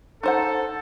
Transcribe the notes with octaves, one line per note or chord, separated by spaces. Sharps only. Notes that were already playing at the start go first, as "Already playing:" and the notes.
D#4 A4 C5 F#5